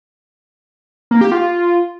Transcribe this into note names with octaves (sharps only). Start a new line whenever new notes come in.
A#3
G4
F4